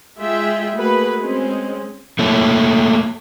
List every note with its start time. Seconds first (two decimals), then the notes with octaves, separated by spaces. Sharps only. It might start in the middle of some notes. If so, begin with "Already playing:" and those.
0.20 G#3 F4 G#4 E5 G5
0.75 A3 A#3 F#4 G#4 B4 B5
1.21 G#3 C4 C#4
2.19 A3 A#3 C#5